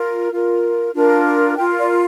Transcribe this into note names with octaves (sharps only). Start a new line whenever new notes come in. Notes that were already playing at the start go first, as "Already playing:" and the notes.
Already playing: F4 A#4
F4 A#4
D4 F4 A#4
F4 A#4 G5
D5